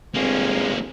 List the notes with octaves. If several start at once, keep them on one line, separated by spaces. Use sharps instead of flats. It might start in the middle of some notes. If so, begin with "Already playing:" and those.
G1 G#3 A#3 C4 C#4